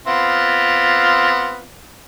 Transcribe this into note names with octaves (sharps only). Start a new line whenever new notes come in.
B3 C4 F4